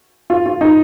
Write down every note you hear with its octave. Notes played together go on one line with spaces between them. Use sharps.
F4
F4
D#4